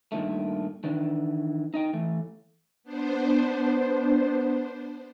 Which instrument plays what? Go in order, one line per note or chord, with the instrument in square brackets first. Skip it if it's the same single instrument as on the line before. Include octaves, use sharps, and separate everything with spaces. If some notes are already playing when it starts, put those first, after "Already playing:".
[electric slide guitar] G2 A#2 D#3 A3
D#3 E3 D4
D#4 D#5 G5
E3 A3
[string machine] B3 D4 C5